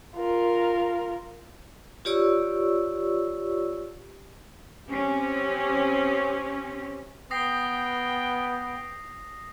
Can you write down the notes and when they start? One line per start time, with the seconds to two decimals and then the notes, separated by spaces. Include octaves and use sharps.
0.17 F4 A#4
2.05 F4 G4 C#5 D5 C#6 E6
4.89 C4 C#4 G4
7.31 B3 G5 D#6 A#6 C7